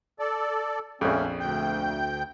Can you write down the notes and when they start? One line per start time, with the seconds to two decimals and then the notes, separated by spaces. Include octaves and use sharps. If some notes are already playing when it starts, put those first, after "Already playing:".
0.19 A4 D5
1.01 A#1 F2 A3 C#4
1.40 D2 G5 G6